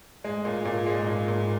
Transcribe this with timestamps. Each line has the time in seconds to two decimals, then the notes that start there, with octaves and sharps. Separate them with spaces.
0.24 G#2 G#3
0.45 A#2
0.56 G#2
0.65 A#2
0.87 G#3
1.07 A#2
1.28 A#2